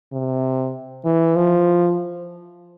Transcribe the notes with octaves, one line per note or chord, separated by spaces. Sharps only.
C3
E3
F3